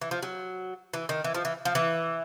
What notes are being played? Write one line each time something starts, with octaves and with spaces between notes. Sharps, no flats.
E3
F3
F#3
E3
D#3
E3
F3
E3
F3
E3